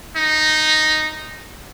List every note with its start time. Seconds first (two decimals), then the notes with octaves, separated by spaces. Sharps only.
0.16 D#4